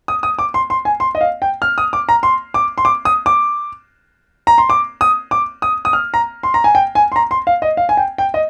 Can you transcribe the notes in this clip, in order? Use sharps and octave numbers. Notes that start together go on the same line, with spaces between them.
D#6
D#6
D6
C6
C6
G#5
C6
D#5
F5
G5
F6
D#6
D6
A#5
C6
D6
C6
D6
D#6
D6
A#5
C6
D6
D#6
D6
D#6
D#6
F6
A#5
C6
A#5
G#5
G5
G#5
C6
A#5
C6
F5
D#5
F5
G#5
G5
G5
D#5